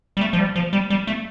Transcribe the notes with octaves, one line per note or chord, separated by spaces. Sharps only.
G3
A3
F3
G3
F3
G3
G3
A3